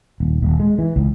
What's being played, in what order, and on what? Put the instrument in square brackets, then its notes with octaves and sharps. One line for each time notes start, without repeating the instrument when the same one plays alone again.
[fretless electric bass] D#1
D#1
G#3
E3
C#2